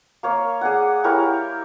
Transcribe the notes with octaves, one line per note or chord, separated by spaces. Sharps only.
A#3 C#5 F5
G#4 D5 F#5
E4 G4 A#4 C#5